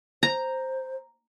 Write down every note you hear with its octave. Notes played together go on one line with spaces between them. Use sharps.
C5 A#5